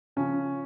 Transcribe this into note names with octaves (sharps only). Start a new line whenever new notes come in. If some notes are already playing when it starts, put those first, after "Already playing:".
C#3 F3 C#4